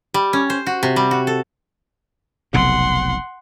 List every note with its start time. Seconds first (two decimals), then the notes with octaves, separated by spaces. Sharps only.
0.14 G3
0.33 C#4
0.50 C5
0.67 F#4
0.83 C3
0.96 G3
1.11 F#4
1.27 A4
2.54 F1 B1 C3 F#5 C6